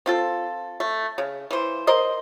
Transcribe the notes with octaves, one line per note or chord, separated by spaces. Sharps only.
C4 F4 A4
A3
C#3
E3 C5
A#4 C5 D#5